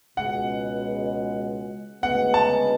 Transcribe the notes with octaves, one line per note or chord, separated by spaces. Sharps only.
C#2 B2 G#3 F#5
D2 C#3 G#3 B3 F#5
A5